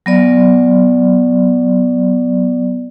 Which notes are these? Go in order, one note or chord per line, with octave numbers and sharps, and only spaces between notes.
F#3 B3 D5